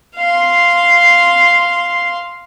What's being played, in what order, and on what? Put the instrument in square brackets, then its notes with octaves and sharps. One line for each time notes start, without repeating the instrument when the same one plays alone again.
[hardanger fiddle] F5 C6